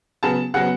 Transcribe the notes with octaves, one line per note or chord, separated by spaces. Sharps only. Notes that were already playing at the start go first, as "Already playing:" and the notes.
C#3 F#3 B3 A5
C#3 F#3 B3 F#5